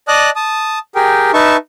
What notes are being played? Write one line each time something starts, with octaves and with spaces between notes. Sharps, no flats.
D5 D#5 A5 D#6 F#6
A5 D#6
G4 G#4 A#4 G5
D#4 B4 E5 A5 C#6